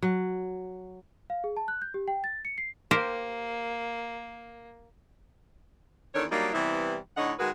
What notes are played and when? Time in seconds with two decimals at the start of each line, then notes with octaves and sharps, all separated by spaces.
0.02 F#3
1.30 F5
1.44 G#4
1.57 A5
1.68 F#6
1.82 G6
1.94 G4
2.08 G5
2.24 A6
2.45 C#7
2.58 C7
2.91 A#3 G4 A#4 C5
6.14 E2 D#3 D4 A4 C#5
6.31 F#3 G3 A#3 D4 D#4
6.53 C3 E3 G3 B3 E4
7.17 A2 D3 D#4 C#5 D#5 F#5
7.38 D#3 G#3 F#4 G#4 A#4 B4